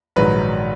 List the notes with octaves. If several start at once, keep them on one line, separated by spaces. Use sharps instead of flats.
A#1 G#2 D#3 F#3 B4